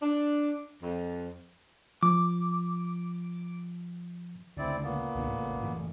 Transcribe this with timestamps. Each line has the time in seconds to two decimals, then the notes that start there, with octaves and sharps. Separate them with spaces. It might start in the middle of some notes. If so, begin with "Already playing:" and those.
0.02 D4
0.83 F2
2.03 F3 D6
4.57 D2 C#3 C4 E4 D5
4.84 A#2 A#3 B3
5.15 C#2 B2 D3
5.29 A1 A2 C#3
5.63 F#1 A2 E3